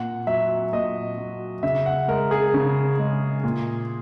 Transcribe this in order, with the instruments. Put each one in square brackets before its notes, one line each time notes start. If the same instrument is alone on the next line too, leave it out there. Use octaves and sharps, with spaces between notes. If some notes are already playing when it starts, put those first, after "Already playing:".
Already playing: [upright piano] A#2 F#5
F#3 E5
A#2 D#5
F#3
C#3 E5
F#5
G#3 A#4
G#4
C#3
G#3
A#2